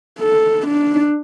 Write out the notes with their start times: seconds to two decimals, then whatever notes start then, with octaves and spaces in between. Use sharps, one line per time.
0.19 A4
0.67 D4